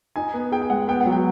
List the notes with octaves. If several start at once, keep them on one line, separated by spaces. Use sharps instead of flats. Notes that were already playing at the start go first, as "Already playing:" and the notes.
D#4 G#5
B3
G#4 G5
G5
G#3 F#5
B3 G5
F#3 F#5
G5